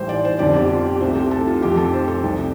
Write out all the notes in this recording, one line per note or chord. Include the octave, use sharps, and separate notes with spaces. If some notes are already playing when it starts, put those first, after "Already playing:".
Already playing: A1 A2 G3 C5
D5
C5
G1 F2 D3 G3 D5
G4
F4
G4
C2 C3 A3 C5
G4
A4
F4
F2 F3 A3 G4
A4
C5
A4
C2 C3 G3